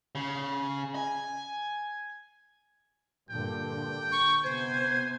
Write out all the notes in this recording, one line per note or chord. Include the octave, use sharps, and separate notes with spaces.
C#3
G#5
G2 A#2 D3 G5
C#6
C3 B3 C5 G#5